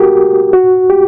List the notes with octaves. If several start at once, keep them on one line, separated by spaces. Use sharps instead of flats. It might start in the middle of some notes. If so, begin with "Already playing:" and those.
Already playing: F#4 G4 A#4
F#4
G4